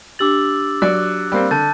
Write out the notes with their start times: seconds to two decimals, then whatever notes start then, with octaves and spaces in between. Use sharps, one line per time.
0.19 D4 G4 D6 E6 A6 F#7
0.82 F#3 D5 F#6
1.32 G3 A#3 C4
1.51 D3 A5 G6 A6